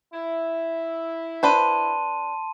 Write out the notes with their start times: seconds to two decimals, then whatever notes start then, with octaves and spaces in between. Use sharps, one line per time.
0.14 E4
1.43 D4 B4 C5 A5 C6 D#7